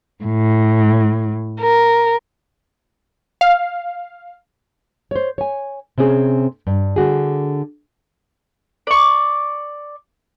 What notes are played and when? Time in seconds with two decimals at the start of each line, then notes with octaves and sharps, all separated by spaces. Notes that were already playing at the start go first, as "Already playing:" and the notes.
0.24 A2
1.59 A#4
3.41 F5
5.11 C5 C#5
5.38 C#5 G#5
5.98 C3 C4 C#4 G#4
6.67 G2
6.96 D3 F#4 G#4
8.87 D5 C#6